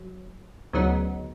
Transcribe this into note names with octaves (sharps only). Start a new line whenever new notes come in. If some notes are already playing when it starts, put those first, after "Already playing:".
Already playing: F#3
D2 C#3 F#3 B3 D#4